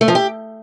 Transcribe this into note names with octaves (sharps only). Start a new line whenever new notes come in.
A3
F3
G4